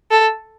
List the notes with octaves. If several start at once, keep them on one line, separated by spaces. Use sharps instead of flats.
A4